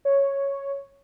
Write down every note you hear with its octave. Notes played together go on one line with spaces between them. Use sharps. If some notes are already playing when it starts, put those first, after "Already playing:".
C#5